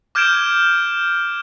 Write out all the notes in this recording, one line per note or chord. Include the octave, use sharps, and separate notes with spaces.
D6 F6 G6 G#6 D7 E7